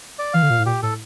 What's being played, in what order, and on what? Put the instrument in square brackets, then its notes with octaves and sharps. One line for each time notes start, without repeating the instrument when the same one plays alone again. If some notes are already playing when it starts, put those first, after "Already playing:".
[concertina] D5
[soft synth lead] E3 [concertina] F5
[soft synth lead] D3
A#2
A2
[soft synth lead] A#2 [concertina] G4
[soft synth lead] A2 [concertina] A4